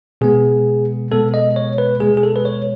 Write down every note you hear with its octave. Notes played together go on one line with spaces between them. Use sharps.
B2 G#3 B3 G#4
B2 G#3 B3 A4
D#5
C#5
B4
B2 G#3 B3 G#4
G#4
A4
B4
C#5